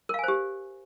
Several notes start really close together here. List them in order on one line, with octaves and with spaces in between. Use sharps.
A#4 F5 G#5 C5 G4